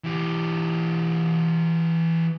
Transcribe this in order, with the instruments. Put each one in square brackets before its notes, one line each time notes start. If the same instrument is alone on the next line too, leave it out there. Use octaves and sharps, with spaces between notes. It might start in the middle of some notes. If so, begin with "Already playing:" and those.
[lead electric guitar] E3 G4